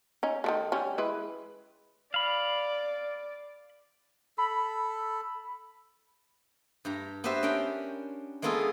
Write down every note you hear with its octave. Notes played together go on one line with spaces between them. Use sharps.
C#4 D#4
D#3 F3 A3
D3 G3 C#4
E3 G#3 B4
D5 F5 B5
A4 B5
G2 G4 A#5
B3 F#4 G4 B4 C5 E5
C#4 D4 A#4 G5
G#3 A#3 B3 F4 G#4 A4